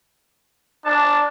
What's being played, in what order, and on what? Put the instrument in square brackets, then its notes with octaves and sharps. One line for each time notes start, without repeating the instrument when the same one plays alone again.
[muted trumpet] D4 [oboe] A5